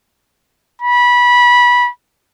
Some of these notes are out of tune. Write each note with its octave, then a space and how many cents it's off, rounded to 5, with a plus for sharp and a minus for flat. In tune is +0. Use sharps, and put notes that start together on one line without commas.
B5 -20